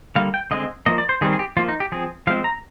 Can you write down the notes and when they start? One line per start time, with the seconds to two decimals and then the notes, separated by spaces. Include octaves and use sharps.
0.16 D3 G3 A#3 F5
0.34 G5
0.51 D3 G#3 C4 D#5
0.86 F3 A#3 D#5
0.98 D5
1.09 C5
1.21 D#3 G3 C4 G#4
1.33 G#4
1.39 G4
1.57 F3 A#3 F4
1.69 D#4
1.80 G4
1.92 F3 C4 G#4
2.27 F3 G#3 C4 F5
2.44 A#5